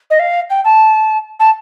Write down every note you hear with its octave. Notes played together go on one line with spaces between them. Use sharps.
D#5
F5
G5
A5
A5